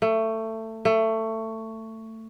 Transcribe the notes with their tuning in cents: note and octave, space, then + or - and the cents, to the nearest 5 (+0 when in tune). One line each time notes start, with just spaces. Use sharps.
A3 +20
A3 +20